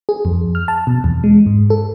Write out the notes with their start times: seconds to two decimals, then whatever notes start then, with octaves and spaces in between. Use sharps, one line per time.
0.09 G#4
0.25 F2
0.55 F6
0.68 A5
0.87 B2
1.04 E2
1.24 G#3
1.46 G#2
1.70 A4